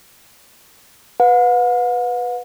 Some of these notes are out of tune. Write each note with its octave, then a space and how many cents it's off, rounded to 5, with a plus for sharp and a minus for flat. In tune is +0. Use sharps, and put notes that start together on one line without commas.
B4 +0 F#5 -45